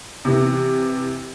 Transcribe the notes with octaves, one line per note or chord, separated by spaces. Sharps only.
C3 E3